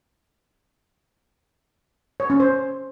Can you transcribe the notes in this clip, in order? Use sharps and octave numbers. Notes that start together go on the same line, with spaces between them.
C#5
C#4
C5